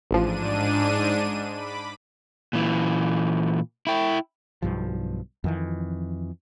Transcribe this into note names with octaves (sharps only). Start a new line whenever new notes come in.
A1 G#2 F3 D4 D#7
B5 D6
A#2 E3
E4 G5
B1 G2 F3
F2 D#3 E3